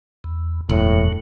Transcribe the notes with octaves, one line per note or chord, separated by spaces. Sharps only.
E2
E1 F#2 A2 F#3